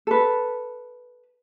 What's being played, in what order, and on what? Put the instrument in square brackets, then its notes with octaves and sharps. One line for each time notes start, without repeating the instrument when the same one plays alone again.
[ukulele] A4 B4